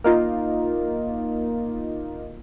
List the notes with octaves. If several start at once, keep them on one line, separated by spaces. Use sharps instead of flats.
A#3 D#4 F4